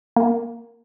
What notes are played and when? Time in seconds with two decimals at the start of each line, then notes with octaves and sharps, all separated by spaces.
0.16 A#3